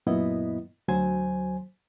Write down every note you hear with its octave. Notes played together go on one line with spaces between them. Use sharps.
F#2 A#2 B3 E4 D#5
D2 F#3 C5 G#5